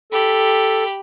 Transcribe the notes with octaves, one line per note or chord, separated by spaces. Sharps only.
G4 A4 B5